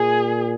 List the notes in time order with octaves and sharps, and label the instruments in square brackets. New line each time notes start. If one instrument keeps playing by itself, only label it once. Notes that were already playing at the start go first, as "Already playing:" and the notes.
Already playing: [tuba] A#2 [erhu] G#4